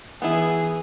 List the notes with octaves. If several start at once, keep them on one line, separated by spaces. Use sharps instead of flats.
E3 B3 E4 G#4